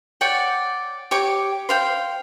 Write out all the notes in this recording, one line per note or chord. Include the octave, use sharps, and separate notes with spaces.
C#5 D5 F#5 G5
G4 C#5 D6
C5 F5 G5